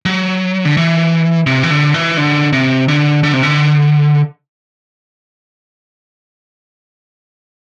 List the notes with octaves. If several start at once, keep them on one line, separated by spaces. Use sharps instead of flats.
F#3
D3
E3
C3
E3
D3
E3
D3
C3
D3
D3
C3
D3